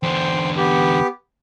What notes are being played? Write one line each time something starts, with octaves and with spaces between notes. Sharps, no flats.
E2 D3 C5 G5
B3 G4